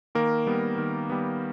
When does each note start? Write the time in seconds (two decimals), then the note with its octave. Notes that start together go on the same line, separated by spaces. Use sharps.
0.15 D#3 A#3 A#4
0.47 G3 B3
0.78 D#3
1.10 G3 B3